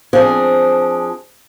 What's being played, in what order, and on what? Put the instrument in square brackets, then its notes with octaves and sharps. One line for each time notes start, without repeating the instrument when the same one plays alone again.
[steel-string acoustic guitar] F3 C4 D4 G#4